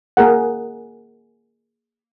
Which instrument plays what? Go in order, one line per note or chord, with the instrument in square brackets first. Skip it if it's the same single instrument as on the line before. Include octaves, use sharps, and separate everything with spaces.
[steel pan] A#3 G#4 A#4 F#5